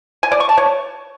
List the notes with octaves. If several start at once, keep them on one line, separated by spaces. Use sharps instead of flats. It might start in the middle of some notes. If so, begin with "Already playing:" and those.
G#5
D5
C#6
A5
C#5